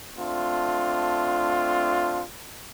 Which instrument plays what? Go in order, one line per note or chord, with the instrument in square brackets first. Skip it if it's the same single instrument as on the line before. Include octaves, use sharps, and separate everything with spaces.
[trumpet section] A3 C4 D4 F4